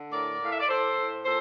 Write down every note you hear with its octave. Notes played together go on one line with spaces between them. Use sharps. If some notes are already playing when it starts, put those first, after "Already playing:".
Already playing: D3
A2 A#4 D5
A2 F5
E5
D5
A2 A4 C5
A2
A#2 A4 C5